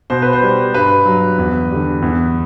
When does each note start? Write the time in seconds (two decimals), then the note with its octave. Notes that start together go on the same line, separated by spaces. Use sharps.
0.10 B2 C5
0.22 B4
0.33 C5
0.42 G3
0.74 G2 B4
1.06 F#3
1.38 E2
1.70 D3 G3
2.02 E2